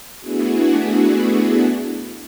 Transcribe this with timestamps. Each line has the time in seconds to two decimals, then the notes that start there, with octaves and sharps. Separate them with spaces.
0.19 A3 B3 D4 E4 F#4 G#4